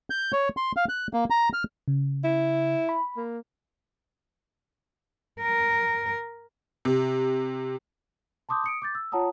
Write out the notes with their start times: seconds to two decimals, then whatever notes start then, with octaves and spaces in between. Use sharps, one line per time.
0.10 G6
0.33 C#5
0.57 C6
0.77 F5
0.89 F#6
1.13 A#3
1.30 A#5
1.53 F6
1.88 C#3
2.24 E4
2.89 B5
3.17 A#3
5.42 A#4
6.85 C3
8.49 A5 C6 D6 D#6 G6
8.64 D#6 C#7 D7
8.82 D6 G6 A6
8.95 E6
9.12 F4 C#5 F#5 A5 A#5 D#6